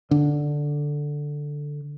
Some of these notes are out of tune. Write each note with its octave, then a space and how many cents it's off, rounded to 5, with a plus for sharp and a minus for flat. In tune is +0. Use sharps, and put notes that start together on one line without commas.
D3 +0 D4 +0